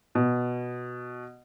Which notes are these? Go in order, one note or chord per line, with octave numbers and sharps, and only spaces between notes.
B2